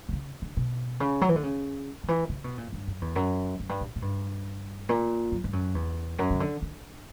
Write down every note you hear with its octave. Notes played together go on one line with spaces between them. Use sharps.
D3
C#3
D3
B2
C#3
F#3
E3
D3
C#3
D3
E3
C#3
B2
A#2
G2
F#2
E2
F#2
F#2
G2
A#2
A#2
G2
A#2
F#2
G2
F#2
E2
F#2
C#3
D3
D3